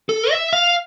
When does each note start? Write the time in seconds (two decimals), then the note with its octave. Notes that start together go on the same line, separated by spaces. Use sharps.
0.09 A4
0.31 E5
0.53 F5